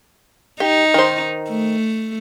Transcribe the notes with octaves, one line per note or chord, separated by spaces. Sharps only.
D#4 G4
D#3 C5
A3